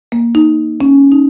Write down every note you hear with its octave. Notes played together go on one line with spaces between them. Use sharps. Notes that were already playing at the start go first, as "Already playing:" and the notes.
A#3
D#4
C#4
D#4